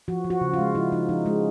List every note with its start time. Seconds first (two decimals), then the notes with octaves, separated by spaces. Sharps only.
0.08 F3 F#4
0.24 F3
0.30 F#4
0.41 C#3
0.54 F4
0.59 G#3
0.75 F3 E4
0.92 F3 D#4
1.09 F3 D#4
1.26 G#3 C#4